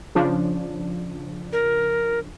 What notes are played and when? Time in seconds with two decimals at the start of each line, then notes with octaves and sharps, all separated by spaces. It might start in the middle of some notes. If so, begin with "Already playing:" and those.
0.15 C#3 F3 D4
1.53 A#4